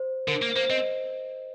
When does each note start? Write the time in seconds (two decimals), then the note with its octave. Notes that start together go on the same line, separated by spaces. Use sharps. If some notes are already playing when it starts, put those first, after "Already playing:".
Already playing: C5
0.28 D3 A#4
0.42 A#3
0.56 A#3 C5
0.70 C4 D#5